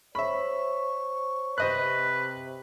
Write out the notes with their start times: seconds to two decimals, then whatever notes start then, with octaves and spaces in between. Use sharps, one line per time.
0.15 C5 C#5 E5 B5 C#6
1.58 C3 B4 C5 D#5 F#6